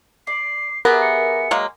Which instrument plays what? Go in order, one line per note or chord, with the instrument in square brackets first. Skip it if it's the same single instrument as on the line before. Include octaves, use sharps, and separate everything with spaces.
[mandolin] D5 [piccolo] C7
[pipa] B3 [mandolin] G4 G#4 E5 [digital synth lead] A#4
[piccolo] C#7
[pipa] F#3 G#3 A#3